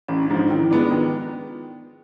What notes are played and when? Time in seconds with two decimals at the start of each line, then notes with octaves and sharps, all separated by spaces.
0.08 A1 C#4
0.23 D4
0.30 G#2 F3
0.37 D#4
0.50 D#3 E4
0.71 G#3 B3 D4 F4
0.91 D#3